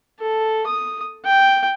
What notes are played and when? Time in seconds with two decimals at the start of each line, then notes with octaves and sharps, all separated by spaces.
0.20 A4
0.67 D#6
1.25 G5